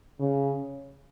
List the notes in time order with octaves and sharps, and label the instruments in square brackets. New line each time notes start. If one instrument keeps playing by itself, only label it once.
[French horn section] C#3